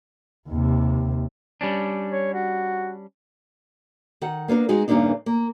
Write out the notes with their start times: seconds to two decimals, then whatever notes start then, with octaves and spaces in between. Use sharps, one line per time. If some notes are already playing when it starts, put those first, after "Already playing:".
0.49 D#2 C3
1.61 G3 C#4 D4
2.11 C#5
2.34 F#4
4.21 D#3 F#5
4.48 A#3 B3 D4 A#4
4.69 G#3 D#4 F#4 G#4
4.88 E2 G2 C#3 A#3 D4 D#4
5.26 A#3